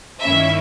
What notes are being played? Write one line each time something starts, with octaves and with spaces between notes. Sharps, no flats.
G2 D#3 A#3 C#4 E4 E5